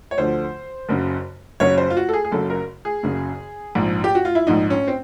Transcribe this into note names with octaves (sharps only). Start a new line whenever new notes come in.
C#5
D2 D3 F3 C5
F#1 F#2 C#3
F#1 F#2 C#3 C#5
C5
F4
F#4
A4
G#4
G#4
F#1 F#2 C#3 A4
A#4
G#4
F#1 F#2 C#3
A#1 G#2 F3
G4
F#4
F4
E4
A#1 G#2 F3 D#4
C#4
C4